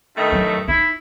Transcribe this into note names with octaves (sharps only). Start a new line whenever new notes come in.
G2 D#3 A3
F#2 F#3
D#4 E4